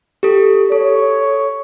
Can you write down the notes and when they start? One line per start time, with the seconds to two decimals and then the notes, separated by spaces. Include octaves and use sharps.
0.23 G4 A4
0.72 A4 C#5